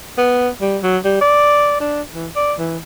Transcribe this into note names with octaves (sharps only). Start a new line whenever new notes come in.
B3
G3
F#3
G3
D5
D4
E3
D5
E3